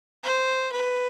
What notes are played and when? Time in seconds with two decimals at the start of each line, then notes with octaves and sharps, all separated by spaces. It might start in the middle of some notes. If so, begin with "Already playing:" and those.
0.23 C5
0.72 B4